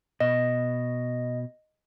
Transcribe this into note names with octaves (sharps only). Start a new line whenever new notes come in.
B2 D#5